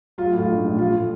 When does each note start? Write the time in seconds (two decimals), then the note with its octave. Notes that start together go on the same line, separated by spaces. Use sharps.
0.18 F#3 F4
0.33 A2
0.38 F4
0.49 A#1
0.64 A#1
0.79 F3 F4
0.95 A2